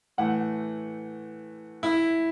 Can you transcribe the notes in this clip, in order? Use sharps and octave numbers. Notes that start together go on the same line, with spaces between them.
A2 E3 A3 F#5
E4